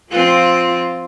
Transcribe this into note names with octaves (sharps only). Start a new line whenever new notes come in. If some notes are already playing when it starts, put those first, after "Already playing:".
F3 C4 F4